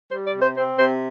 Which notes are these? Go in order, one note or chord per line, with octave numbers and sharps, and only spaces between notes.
G3 C5
D5
C3
C5
C4 C5
C3 C5